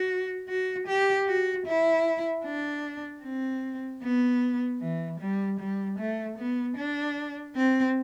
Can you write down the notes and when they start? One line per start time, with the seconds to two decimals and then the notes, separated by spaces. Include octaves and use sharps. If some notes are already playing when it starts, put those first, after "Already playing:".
Already playing: F#4
0.49 F#4
0.88 G4
1.27 F#4
1.67 E4
2.45 D4
3.23 C4
4.03 B3
4.81 E3
5.20 G3
5.60 G3
5.99 A3
6.38 B3
6.78 D4
7.56 C4